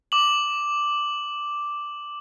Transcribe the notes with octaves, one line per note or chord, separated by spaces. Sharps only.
D6 F#7